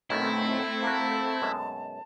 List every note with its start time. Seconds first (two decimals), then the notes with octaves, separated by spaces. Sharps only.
0.10 B1 F#2 D#3 A3 C4 E4
0.83 A#3 F#4 A5
1.42 F#2 B2 G#3